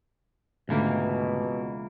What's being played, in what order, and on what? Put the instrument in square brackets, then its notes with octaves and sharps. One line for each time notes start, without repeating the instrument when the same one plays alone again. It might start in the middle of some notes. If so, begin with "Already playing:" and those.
[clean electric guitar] C#2 E3 A#3 [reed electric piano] G#2 D3 A3 [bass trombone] B2